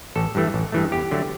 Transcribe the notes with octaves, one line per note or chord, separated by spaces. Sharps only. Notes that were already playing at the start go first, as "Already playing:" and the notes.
A1 A4
G2 E3 A3
A1
G2 E3 A3
E2 G4
D3 F#3 A3